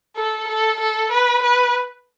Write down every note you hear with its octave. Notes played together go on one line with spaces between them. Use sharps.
A4
A4
A4
B4
B4